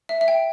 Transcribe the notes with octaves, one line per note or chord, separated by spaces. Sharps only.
E5
E5
G5